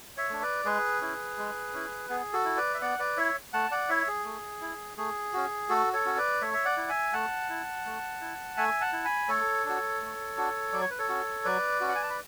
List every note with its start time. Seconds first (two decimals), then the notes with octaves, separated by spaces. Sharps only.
0.17 C#5 E5
0.29 A3 D4
0.42 B4 D5
0.65 G#3 G#4 B4
1.01 C#4 E4
1.38 G#3
1.73 C#4 E4
2.09 B3 G#4
2.33 F#4 A4
2.45 E4
2.57 B4 D5
2.74 E5
2.81 B3 D5 F#5
2.99 B4 D5
3.17 E4 C#5 E5
3.53 A3 F#5 A5
3.71 D5 F#5
3.89 E4 C#5 E5
4.08 G#4
4.25 A3
4.61 E4
4.97 A3 G#4
5.33 C#4 F#4
5.69 A3 F#4 A4
5.93 A4 C#5
6.05 C#4 F#4
6.17 B4 D5
6.41 A3 C#5 E5
6.54 E5
6.65 D5 F#5
6.77 E4
6.89 E5 G#5
7.13 A3 F#5 A5
7.50 E4
7.86 A3
8.21 E4
8.57 A3 E5 G#5
8.81 F#5 A5
8.93 E4
9.05 G#5 B5
9.28 A3 A4 C#5
9.65 D4 F#4
10.01 A3
10.37 D4 F#4
10.73 F#3 D5
10.81 C#5
10.90 B4
10.99 A4 C#5
11.08 C#4 F#4
11.45 F#3 B4 D5
11.81 C#4 F#4
11.88 F#5
11.95 G#5
12.03 A5
12.10 B5